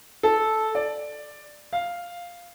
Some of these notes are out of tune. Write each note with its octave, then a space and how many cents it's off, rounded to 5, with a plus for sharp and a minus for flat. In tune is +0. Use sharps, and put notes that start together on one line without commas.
A4 -10
D5 +10
F5 +0